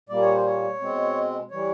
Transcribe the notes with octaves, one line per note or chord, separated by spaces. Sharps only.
A#2 G3 A#3 D5
C#5
C5
C#5
B2 G#3 C4
E3 G3 C#5